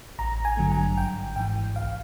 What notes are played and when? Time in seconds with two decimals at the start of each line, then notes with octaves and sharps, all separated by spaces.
0.19 A1 A#5
0.45 G#5
0.57 G2 D3 F#3 A3
0.72 G#5
0.98 G#1 G5
1.36 G#2 E3 G5
1.76 C2 F5